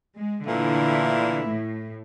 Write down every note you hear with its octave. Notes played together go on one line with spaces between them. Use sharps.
G#3
A#2 D3 E3 A3 E4
A2